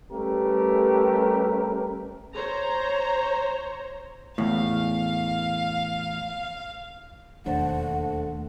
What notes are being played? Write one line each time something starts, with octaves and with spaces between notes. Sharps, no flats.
G3 A3 C#4 G4 A#4 B4
C5 C#5 A#5
E2 A2 F5
E1 D#2 A3 D4 C5 F#5 A5